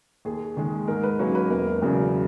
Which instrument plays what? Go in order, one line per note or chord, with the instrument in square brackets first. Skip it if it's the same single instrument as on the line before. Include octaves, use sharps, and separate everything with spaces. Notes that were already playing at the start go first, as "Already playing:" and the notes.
[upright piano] D#2 G#4
D#3 G#3
G#2 A#4
B4
F#3 A#3 C#4 C#5
B4
E1 A#4
E2 C#3 F#3